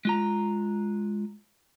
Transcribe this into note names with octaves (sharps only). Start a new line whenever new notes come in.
G#3 F4 A#5